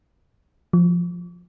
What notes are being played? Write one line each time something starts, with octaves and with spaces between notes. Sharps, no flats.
F3